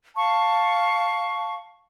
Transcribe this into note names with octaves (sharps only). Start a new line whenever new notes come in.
F5 A5 C#6